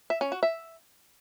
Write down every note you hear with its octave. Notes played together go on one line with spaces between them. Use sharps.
E5
C#4
F#4
E5